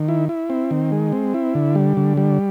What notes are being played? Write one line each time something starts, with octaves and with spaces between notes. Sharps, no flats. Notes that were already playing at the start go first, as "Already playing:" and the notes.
Already playing: D#3
E4
E4
C4
D#3
G#3
C4
E4
D3
G3
D3
G3